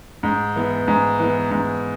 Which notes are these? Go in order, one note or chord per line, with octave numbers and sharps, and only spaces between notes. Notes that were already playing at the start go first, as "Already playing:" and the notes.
G#2
E3 B3
G#2
E3 B3
G#2